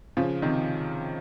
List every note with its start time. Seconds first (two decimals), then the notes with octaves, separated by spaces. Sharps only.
0.17 C#3 F3
0.42 C3 D#3